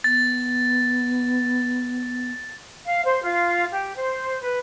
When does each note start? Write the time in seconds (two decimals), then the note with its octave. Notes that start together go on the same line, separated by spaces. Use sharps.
0.04 B3 A6
2.86 F5
3.06 C5
3.23 F4
3.72 G4
3.96 C5
4.41 B4